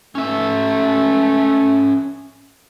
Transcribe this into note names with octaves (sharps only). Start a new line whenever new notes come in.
A3 C#4 E5